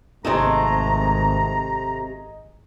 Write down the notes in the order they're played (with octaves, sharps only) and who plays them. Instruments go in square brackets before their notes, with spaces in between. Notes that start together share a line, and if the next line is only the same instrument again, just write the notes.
[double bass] G#1 [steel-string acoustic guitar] C3 G#3 A3 [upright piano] D#4 G#4 [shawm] A#5